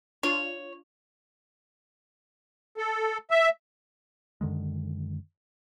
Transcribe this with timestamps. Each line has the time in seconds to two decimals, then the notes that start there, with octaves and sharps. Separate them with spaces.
0.23 D4 F4 C#5
2.77 A4
3.31 E5
4.41 F#2 D3 D#3 G#3